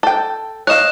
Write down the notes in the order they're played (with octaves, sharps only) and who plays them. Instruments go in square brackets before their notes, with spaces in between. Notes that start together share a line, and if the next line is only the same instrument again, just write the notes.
[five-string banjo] A4 G5
[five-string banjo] C#5 D#5 F5 [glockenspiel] F#6 E7